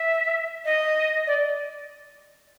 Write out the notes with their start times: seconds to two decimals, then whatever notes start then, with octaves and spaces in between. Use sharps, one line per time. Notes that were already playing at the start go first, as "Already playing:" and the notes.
Already playing: E5
0.65 D#5
1.27 D5